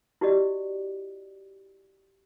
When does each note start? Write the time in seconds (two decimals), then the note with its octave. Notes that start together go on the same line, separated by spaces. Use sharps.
0.21 E4 F#4 G4 D5 D#5